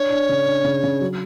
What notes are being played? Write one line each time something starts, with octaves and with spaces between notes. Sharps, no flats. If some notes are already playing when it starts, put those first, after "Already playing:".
Already playing: D4 C#5
D4
C#3
D4
C#3
C#3
F#3